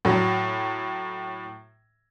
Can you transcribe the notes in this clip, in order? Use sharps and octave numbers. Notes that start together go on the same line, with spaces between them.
A2 F#3